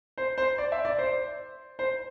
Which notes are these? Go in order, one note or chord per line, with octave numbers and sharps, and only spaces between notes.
C5
C5
D5
E5
D5
C5
C5